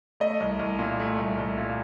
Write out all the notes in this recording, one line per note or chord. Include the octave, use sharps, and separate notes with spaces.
A3 D#5
C2
C2
A#2
A3
C2
C2
A#2